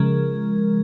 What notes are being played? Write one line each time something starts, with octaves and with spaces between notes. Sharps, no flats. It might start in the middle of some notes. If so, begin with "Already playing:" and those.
Already playing: C#3 F3 G#3 A#4